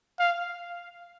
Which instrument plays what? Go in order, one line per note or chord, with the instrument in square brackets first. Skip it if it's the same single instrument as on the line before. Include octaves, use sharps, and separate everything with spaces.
[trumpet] F5